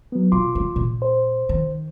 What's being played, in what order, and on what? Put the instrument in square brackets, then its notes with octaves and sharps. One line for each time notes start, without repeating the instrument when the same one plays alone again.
[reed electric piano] F#3 B3
[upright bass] B2 [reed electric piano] F4 C6 D6
[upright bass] G3
A#2
[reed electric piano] C5
[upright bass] D#3